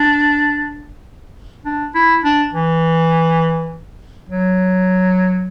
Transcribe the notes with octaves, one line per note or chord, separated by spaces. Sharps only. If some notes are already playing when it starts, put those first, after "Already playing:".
Already playing: D4
D4
E4
D4
E3
F#3